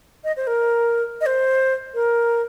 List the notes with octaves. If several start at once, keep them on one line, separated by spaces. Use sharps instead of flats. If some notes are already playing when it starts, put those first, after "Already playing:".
D#5
C5
A#4
D#5
C5
A#4